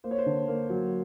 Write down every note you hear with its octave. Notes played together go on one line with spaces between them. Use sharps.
A#3 C5
C#5
C5
D3
A#3
F#3